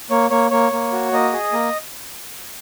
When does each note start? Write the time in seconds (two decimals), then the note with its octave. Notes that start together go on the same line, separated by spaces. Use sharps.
0.10 A#3 C#5
0.30 A#3 C#5
0.51 A#3 C#5
0.72 A#3
0.92 F#4
1.12 A#3 D#5
1.33 G#4
1.53 A#3